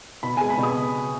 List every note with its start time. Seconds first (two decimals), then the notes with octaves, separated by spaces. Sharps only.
0.23 B2 B5
0.37 G#5
0.41 G#3
0.50 B5
0.58 B2
0.63 D#6